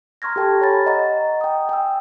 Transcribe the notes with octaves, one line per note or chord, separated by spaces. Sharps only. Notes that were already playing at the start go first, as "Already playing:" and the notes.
A#5 C6 C#6 F6 G#6 A#6
G4 A4 G5 A5
C#5 G#5 B5 A6
D#5 F#5 A#5 C#6 A6
G5 D#6
G5 G#5 E6